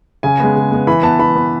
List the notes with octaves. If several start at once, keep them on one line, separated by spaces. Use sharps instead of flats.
C#3 G#5
G#3 B3
C#3
G#3 B3
E3 B5
B3 A5
E3 B5
B3